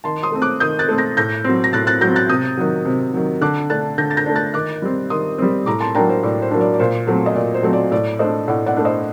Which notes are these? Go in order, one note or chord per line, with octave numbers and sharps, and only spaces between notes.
D#3 A5 C6
C6 D#6
A3 C4
D6 F#6
D#3 D#6 G6
F#6 A6
A3 C4
G6 A#6
A2 G6 A#6
F#3 C4
A#6
A2 F#6 A6
F#6 A6
F#3 C4 G6 A#6
F#6 A6
C3 D#6 G6
D#3 F#3
C3
D#3 F#3
D3 D6 F#6
A3 D4 F#6 A6
D3 G6 A#6
A6
G6 A#6
A3 D4
F#6 A6
D#3 D6 F#6
G3 C4
D#3 C6 D#6
G3 C4
A2 A#5 D6
A5 C6
F#3 A#3 D4 G5 A#5
C5
A2 D5
C5
F#3 A#3 D4
D5
D5
A#2 C5
F#3 A3 C4
D#5
A#2 D5
C5
F#3 A3 C4
D5
A2 D5
A3 D4 C5 D#5
A2 D5 F#5
D5 F#5
A3 D4
C5 D#5